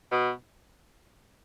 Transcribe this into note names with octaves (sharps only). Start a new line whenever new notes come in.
B2